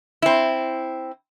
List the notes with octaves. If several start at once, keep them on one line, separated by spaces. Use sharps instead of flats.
C4 E4